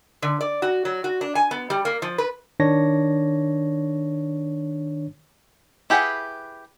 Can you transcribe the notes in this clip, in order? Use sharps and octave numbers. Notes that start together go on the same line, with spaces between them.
D3
D5
F#4
F#3
F#4
D4
G#5
B3
G3
A#3
F3
B4
D#3 D4 C#5 A#6
E4 G4 G#4 B4 F#5